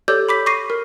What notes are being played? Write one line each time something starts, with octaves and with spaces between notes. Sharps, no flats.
G4 A4 C#5 D5 D6 G6
B5 D6 B6
C#6 D6 A#6 C7 D#7
A#4